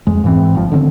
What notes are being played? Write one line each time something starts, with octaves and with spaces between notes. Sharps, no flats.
F2 G#3
G#2 E3 C4
G1 F3
D3 D#3 G3 C4